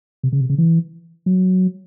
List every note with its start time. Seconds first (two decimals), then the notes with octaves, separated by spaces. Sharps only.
0.23 C3
0.32 C#3
0.40 C3
0.50 C#3
0.58 E3
1.26 F#3